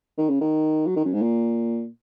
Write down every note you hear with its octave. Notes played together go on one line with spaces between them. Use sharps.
D#3
C#3
D#3
F#3
D#3
F#2
G#2
A#2